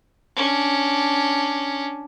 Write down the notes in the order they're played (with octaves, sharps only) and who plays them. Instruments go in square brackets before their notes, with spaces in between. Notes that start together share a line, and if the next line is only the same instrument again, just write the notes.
[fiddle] C#4 D4